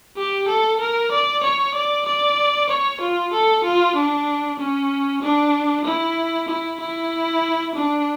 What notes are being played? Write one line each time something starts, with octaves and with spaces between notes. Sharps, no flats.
G4
A4
A#4
D5
C#5
D5
D5
C#5
F4
A4
F4
D4
C#4
D4
E4
E4
E4
D4